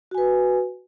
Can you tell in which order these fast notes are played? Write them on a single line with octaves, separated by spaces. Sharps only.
F#4 G#5 B4